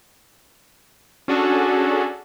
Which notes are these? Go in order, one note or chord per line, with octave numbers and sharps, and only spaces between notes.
C#4 D4 F#4 G#4 A4